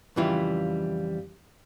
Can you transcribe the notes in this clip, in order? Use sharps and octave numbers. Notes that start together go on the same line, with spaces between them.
F2 C#3 E3 G3 E4 F4